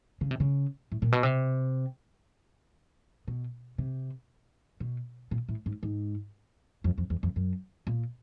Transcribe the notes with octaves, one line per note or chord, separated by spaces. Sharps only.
C#3
C3
C#3
A2
A#2
B2
C3
B2
C3
B2
A#2
A2
G#2
G#2
F2
F2
E2
F2
F#2
A#2